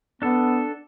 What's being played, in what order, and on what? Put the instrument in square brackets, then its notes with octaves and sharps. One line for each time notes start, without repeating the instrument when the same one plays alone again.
[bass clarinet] B3 [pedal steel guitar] D4 A4